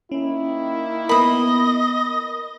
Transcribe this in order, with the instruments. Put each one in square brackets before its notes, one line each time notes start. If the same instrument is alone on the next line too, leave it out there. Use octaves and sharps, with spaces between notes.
[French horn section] D#3 A#3 E4 [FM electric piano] C#4
[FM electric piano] B3 A#4 [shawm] D#5 [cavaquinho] B5 D#6